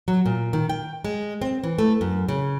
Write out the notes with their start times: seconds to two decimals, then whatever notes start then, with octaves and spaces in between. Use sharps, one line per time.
0.08 F#3
0.26 A#2
0.53 D#3
0.69 G5
1.04 G#3
1.42 C4
1.64 E3
1.78 A3
2.01 F#2
2.28 C#3